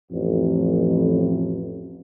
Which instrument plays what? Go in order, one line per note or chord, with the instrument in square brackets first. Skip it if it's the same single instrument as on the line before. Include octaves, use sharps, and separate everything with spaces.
[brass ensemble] A1 F2